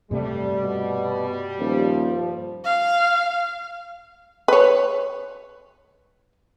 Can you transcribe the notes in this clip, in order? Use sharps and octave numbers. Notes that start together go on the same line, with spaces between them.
G2 C3 G3 A3
B2
D#1 F3
F5
B4 C#5